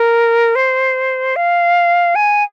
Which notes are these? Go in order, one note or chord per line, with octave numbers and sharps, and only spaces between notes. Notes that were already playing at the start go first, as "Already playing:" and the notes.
Already playing: A#4
C5
F5
G#5